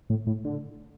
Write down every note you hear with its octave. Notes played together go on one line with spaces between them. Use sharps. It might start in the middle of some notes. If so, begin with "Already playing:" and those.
A2
A2
D3